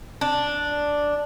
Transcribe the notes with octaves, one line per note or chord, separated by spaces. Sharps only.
D4